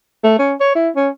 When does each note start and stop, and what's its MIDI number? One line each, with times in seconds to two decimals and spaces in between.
0.24 0.38 57
0.39 0.54 61
0.60 0.71 73
0.75 0.90 64
0.96 1.09 61